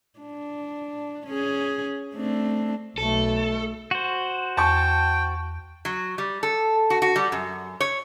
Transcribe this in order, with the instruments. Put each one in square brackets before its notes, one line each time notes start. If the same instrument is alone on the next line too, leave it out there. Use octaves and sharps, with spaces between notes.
[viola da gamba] D4
C#4 G#4
A3 C4 D4
[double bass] B1 A3 [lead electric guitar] A4
[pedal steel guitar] F#4 C5
[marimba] E2 [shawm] G5 [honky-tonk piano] A5 C#6
[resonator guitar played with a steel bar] F#3
G3
A4
F#4
F#4
G3
F#2
C#5